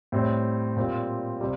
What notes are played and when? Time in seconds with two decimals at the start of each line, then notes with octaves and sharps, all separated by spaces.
0.12 A2 G3 C4
0.76 A#2 G3 C4
1.41 C3 G3